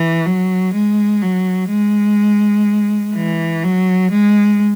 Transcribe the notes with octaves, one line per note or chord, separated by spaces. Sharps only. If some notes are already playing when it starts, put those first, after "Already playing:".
Already playing: E3
F#3
G#3
F#3
G#3
E3
F#3
G#3